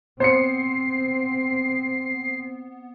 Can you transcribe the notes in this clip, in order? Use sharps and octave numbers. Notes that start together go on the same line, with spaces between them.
B3 C4 C5 C7 C#7